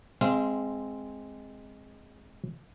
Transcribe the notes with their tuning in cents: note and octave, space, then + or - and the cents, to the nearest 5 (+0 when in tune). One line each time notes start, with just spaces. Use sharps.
G#3 +0 C4 +0 F5 -30